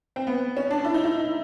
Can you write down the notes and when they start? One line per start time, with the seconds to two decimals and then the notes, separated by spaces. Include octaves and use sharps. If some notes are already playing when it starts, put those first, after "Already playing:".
0.16 C4
0.27 B3
0.57 C#4
0.71 D4
0.84 E4
0.94 D#4
1.04 E4